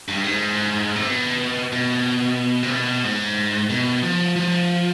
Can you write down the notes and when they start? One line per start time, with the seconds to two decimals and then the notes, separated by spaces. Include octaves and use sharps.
0.08 G2
0.24 G#2
0.96 C3
1.07 B2
1.72 B2
2.63 C3
2.71 B2
3.04 G#2
3.70 B2
4.03 F3
4.36 F3